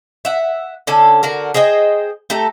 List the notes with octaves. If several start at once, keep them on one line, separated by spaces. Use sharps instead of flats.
E5 F#5
D3 C#4 A4
D3 F#4 A#4
G#4 C5 D#5 G5
A3 G4 A4 A#5